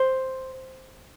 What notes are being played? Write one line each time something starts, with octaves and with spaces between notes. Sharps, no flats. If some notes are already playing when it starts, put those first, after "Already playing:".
Already playing: C5